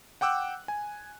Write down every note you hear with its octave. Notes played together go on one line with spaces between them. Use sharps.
F#5 G5 D6 E6 F#6
G#5